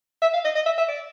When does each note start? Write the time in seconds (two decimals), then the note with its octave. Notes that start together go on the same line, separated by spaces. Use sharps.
0.22 E5
0.34 F5
0.45 D#5
0.55 D#5
0.66 E5
0.78 E5
0.89 D5